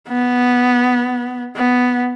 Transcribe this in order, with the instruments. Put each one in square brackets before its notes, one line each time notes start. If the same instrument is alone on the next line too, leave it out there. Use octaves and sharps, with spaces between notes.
[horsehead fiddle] B3
B3